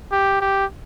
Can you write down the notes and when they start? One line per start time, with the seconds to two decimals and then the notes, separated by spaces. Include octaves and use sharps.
0.12 G4
0.41 G4